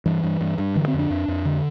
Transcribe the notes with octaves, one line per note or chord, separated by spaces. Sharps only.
G2 E3
G2
G2
G2
D3 E3
C4
F2
D4
F2
F2
D3